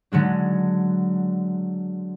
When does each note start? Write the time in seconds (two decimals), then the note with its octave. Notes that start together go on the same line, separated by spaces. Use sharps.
0.12 D3 F#3 G#3 D4